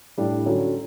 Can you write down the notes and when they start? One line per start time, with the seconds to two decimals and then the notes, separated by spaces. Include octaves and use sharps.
0.18 A2 G3 D4
0.46 D3 F#3 C#4